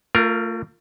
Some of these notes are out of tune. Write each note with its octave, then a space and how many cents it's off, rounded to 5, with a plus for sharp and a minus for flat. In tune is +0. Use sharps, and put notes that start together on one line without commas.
A3 +35 F4 +0 A#4 +5